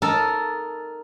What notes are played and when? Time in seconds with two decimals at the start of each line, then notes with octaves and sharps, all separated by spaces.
0.02 D#4 A4 A#4 A5